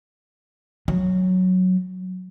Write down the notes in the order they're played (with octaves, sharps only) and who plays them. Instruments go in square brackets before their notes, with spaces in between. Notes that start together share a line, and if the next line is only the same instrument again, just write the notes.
[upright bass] F#3